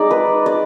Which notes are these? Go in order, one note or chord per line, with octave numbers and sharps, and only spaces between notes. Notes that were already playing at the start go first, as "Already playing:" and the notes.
Already playing: G#3 D#4 D5
B4
D5